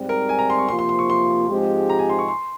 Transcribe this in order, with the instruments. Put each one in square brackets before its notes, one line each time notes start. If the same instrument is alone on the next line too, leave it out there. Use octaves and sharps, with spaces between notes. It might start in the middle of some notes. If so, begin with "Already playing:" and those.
Already playing: [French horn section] G#2 G3 C4
[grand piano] A#4
G#5
A#5
C6
C#6
[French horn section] C3 F3 A#3 F4 [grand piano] C6
[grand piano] C6
C6
C#6
C6
[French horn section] G#2 F3 G#3 C4 G4
[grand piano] A#5
G#5
C6
C#6
C6